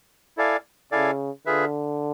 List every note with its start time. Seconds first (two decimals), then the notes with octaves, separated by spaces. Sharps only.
0.37 E4 A4 D5 F5 G#5
0.92 C#3 E4 A4 D5 F5 G#5
1.46 D3 F4 G#4 B4 E5